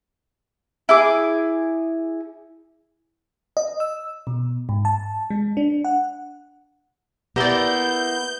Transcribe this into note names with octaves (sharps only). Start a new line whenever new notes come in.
E4 G#4 D6
D#5
E6
B2
G#2
A5
G#3
D4
F#5
A#3 B3 E4 G4 D5 G6